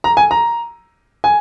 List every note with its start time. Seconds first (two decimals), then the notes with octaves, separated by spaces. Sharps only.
0.04 A#5
0.17 G#5
0.31 A#5
1.24 G#5